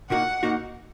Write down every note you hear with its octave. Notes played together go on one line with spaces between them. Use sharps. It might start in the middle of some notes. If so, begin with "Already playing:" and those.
A#2 A#3 D#4 F#4 F#5
A#2 A#3 D#4 F#4